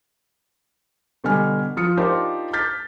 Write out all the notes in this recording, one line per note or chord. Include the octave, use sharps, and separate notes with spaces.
B2 D3 G3 G#5 F6
F3 F4 D#6 F6 C#7
D4 D#4 F4 G4 A#4 C5
D6 F6 G6 A6 B6